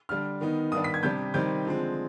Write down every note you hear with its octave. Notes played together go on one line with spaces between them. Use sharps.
D3 G3 D4 F6
D#3 B3 D#4
G2 D#3 B3 D4 D#6
B6
G#6
C3 G3 D4 G6
C3 D#3 G3 C4 D#4 G6
D3 F3 G#3 C4